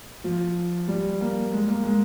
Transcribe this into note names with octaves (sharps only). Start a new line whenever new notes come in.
F3
G3
A#3
G#3
A#3
G#3